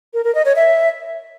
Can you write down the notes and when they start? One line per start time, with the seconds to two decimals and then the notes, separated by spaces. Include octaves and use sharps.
0.14 A#4
0.24 A#4
0.35 D#5
0.45 C#5
0.56 E5